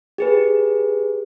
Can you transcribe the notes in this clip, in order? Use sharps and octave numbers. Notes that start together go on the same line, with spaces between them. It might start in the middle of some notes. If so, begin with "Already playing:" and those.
G4 G#4 B4